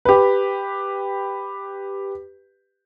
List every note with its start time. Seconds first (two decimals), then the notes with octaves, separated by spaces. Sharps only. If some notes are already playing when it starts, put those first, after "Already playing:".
0.05 G4 B4